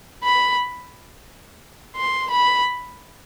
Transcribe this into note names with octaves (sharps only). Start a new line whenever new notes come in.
B5
C6
B5